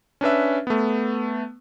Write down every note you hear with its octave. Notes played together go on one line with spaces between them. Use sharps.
C#4 D4 B4 E5
A3 B3